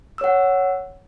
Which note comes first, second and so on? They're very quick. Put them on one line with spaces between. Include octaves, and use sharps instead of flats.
E6 C#5 F#5